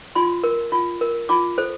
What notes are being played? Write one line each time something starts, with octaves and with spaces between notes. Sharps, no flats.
F4 C6
A#4
F4
A#4
F4 D6
A4 C5